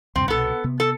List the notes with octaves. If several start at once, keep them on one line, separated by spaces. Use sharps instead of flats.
D2 G2 C3 C4
C2 B2 B3 A4
C3 B3
A4